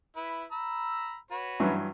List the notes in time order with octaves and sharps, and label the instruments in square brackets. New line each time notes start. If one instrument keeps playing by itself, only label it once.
[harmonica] E4 B4
A#5 B5 E6
F#4 B4 C#5
[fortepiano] G2 E3 F#3